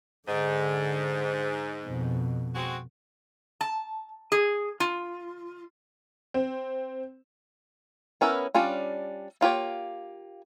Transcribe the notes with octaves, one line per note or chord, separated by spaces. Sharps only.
G#2 D3
F2 B2
G#3 C4 F#4
A5
G#4
F4
C4
B3 C#4 E4 A#4 B4
G3 C#4 D4 F4
A#3 F4 G4 C#5